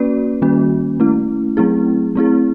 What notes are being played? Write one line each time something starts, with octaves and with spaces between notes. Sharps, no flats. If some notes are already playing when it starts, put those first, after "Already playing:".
Already playing: A#3 C#4 F#4 B4 D5
D#3 G3 A#3 C#4 F#4
A3 C#4 E4
F#3 A3 C4 E4 G#4
A3 C4 E4 G#4